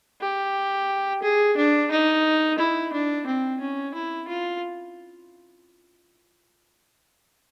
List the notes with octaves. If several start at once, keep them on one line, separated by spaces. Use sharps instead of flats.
G4
G#4
D4
D#4
E4
D4
C4
C#4
E4
F4